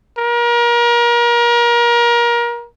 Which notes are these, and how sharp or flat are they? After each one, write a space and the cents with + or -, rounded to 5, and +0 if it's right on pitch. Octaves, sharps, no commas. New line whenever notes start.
A#4 +30